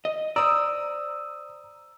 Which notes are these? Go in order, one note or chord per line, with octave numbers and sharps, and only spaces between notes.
D#5
C5 D5 A#5 D#6 E6